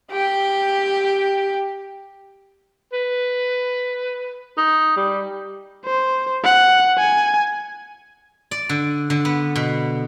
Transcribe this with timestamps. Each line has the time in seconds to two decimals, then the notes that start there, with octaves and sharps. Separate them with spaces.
0.11 G4 G5
2.93 B4
4.58 D#4
4.96 G3
5.85 C5
6.44 F#5
6.98 G#5
8.51 D5
8.69 D3
9.10 D3
9.25 B3
9.56 B2